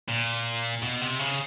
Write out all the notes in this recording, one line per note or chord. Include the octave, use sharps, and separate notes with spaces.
A#2
B2
C3
C#3